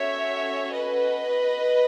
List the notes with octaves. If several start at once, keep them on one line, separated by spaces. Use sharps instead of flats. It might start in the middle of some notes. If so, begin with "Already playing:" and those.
Already playing: C#4 F#4 A4 C#5 E5
B4 D#5